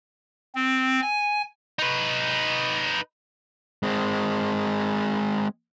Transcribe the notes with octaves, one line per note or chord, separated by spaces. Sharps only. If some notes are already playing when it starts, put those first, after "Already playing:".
C4
G#5
D#4 B4
G#3 C4